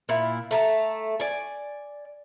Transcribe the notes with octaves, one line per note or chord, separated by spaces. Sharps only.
A#2 E4
A3 A5 A#5
D5 G#5